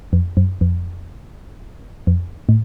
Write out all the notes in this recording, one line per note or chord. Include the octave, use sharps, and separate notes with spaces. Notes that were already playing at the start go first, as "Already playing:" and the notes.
F2
F#2
F2
F2
A2